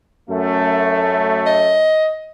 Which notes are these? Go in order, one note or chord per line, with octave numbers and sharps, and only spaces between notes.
F#2 A3
D#5